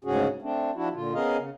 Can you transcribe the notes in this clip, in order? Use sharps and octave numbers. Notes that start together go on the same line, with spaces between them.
D2 G#2 C#3 C#4 F#4 G#4
A3 C4 D4
F3 D4 E4 F#4
A#2 D3 F4
B3 C#4 G#4 A#4 D#5 F5
C#3